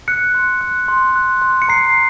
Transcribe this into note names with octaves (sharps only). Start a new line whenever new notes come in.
F#6 C#7
C6
F#6
C6
F#6
C6
C#7
A#5 C7